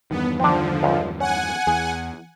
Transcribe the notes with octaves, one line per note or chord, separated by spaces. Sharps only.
E2 G2 D#3 B3
D3 F3 C4 D4
C#2
C#4 F#5 G#5
E2 G#4